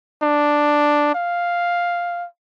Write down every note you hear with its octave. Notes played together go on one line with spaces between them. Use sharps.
D4
F5